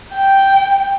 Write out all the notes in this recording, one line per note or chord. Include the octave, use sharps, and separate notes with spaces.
G5